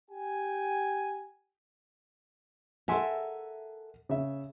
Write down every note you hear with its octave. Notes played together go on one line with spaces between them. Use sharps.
G4 G5 G#5
A4 A#4 E5 F#5 G#5 C6
C#3 E5